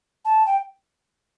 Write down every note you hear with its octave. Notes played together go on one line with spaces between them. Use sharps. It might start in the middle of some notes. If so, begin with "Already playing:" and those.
A5
G5